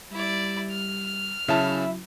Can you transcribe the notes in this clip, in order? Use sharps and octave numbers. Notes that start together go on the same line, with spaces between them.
G3 E4 D5
F6
C#3 F#3 C#4 E4 E5 A5